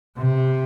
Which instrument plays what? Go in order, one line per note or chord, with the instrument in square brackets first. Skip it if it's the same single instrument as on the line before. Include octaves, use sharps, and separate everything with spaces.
[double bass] C3